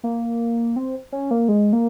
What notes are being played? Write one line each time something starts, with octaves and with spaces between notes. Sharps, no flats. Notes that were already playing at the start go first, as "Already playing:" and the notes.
A#3
C4
C#4
A#3
G#3
A#3